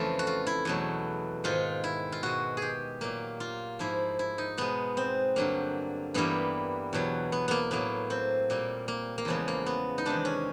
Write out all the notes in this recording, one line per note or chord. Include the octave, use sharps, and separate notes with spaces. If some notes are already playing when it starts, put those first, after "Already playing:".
Already playing: F2 C#3 E3 A3 F4
F#4
F4
E4
E2 B2 F#3 A3
G#2 D#3 G#3 F4
E4
F4
B2 G#3 F#4
G4 G#4
A#2 F#3 A#3
F4
G#2 F3 A#3 E4
E4
D#4
B2 G#3 B3
C4
G2 D3 F#3 A#3
G2 E3 G3 A#3 B3
E2 B2 F#3
B3
A#3 B3
A2 F#3 A#3 B3
C4
A#2 G3 A#3
A#3
A#3
E2 C#3 F3 G#3 B3
A#3
B3
D#4
E2 C3 D#3 G#3 D4
C#4